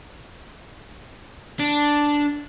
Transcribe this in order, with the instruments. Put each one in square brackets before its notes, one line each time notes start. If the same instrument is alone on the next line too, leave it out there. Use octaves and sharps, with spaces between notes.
[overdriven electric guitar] D4